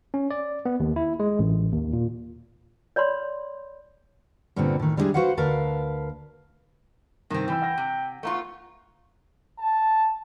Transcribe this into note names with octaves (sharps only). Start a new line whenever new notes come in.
C#4
D5
B3
D#2
E4
G#3
A1
D#2
A#2
C#5 D5 B5 C6
G2 A#2 D3 B3 C4 D4
A2 D#3
G3 G#3 B3 D4 E4 G#4
F#4 B4 C5 F5 F#5
D2 A#4 B4 F5 A5
G2 C3 D#3 C4 A#6
E3 G5 G#5 B5 E6
F#5 E6 A#6
C3
A3 B3 F4 F5 A#5 C#6
A5